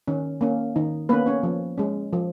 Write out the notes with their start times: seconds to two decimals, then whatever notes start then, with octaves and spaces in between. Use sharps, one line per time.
0.08 D#3 C#4
0.41 A#3 C#4
0.76 D#3 D#4
1.09 A#3 B3 B4
1.13 C#4
1.26 C#4 C#5
1.43 F3
1.77 G#3 C#4
2.13 F3